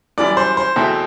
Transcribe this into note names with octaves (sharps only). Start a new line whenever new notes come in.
F#2 E3 G3 D5
C5
C5
E2 B2 A3 C4 E4